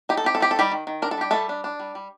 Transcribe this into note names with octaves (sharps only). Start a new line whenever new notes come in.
D#4 G4
A4
C4 G4
A4
C4 G4
A4
D#3 G3 G4
D#3
D#3
D4 A#4
A4
G3 G4
G3 A3 A4
D4
D4
G3
G3